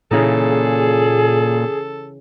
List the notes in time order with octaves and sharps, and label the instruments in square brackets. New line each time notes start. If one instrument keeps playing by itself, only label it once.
[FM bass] A#2 [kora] C#3 E3 D#4 [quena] G#4 [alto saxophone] A4